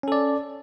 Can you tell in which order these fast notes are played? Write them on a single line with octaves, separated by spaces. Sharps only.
C#4 A4 D5